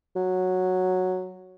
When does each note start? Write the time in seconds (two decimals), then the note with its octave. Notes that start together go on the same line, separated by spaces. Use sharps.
0.16 F#3